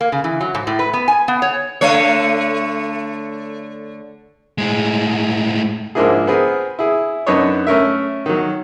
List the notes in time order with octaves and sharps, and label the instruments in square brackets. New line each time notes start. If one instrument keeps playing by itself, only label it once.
[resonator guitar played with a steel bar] A#3
C#3
E3
F#3
G#2
A2
B4
B3
G#5
B3
C#5
[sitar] D3 A3 C#5
[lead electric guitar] A2 G#3
[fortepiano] G#2 F3 A#3 D4 E4 G#4
B3 C4 G#4 A#4
E4 G#4
F#2 B3 D4 D#4 C#5
A3 C#4 A#4 E5
D#3 F#3